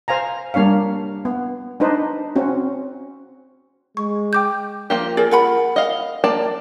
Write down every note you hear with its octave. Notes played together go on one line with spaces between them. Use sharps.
C5 F5 G#5 A#5
G3 A#3 D4 C#5 F5
B3
D4 D#4 B4 C5
C4 C#4 F#4
G#3 C#6
G5 D6 G6
F3 A#3 G4
G#4 A#4 D5
A#4 F#5 B5
D#5 F5
A#3 D5 A5